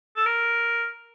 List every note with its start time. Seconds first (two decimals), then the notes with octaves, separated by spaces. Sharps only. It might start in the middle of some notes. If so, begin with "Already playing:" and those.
0.16 A4
0.26 A#4